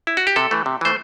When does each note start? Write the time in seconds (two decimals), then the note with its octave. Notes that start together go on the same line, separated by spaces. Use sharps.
0.07 E4
0.17 F#4
0.27 G4
0.36 C3 A4
0.51 E3 A3
0.66 C3
0.81 E3 A3 C5